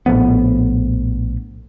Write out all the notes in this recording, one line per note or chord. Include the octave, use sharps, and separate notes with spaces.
A#1 A2 F3 B3